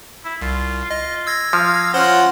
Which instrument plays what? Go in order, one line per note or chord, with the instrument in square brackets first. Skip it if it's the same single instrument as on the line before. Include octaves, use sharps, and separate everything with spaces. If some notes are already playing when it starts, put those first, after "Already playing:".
[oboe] E4
[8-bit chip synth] C2 [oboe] F4
[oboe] F4 [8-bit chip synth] D#5
[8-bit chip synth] E6 G#6 A#6
[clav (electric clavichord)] F3 [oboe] F5
[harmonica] C#4 F4 F#5 [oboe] A#4 [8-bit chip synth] C5 C6